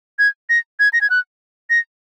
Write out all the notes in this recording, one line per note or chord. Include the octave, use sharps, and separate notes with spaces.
G#6
A#6
G#6
A#6
G#6
F#6
A#6